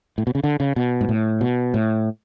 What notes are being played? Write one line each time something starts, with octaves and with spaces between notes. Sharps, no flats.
A2
B2
C#3
D3
C#3
B2
G#2
A2
B2
A2